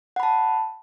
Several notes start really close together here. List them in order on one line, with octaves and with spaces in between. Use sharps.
F#5 B5 A5